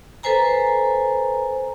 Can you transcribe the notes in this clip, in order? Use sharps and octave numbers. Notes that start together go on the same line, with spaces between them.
A4 B4 C5 G#5 A#5